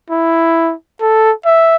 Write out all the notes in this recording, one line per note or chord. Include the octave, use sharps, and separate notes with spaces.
E4
A4
E5